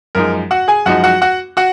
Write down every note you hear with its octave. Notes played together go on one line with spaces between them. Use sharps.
F#2 F3 G#3 D#4 A#4
F#4 F#5
G#4 G#5
F#2 F3 G#3 D#4 F#4 F#5
F#4 F#5
F#4 F#5
F#4 F#5